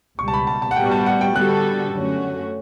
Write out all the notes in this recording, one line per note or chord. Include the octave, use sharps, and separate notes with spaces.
C#2 B2 G3 C#6
A5
B5
A5
A5
F#5
A2 G3 B3 F#4 G5
A5
F#5
G5
D3 G3 B3 F#4 A4 F#6
F#2 D3 A3 C#4 F#4